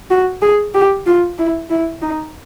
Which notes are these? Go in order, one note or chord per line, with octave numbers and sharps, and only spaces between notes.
F#4
G#4
G4
F4
E4
E4
D#4